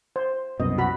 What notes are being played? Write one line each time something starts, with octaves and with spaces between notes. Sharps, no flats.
C5
C2 F#2 B2 D#5
F#4 B5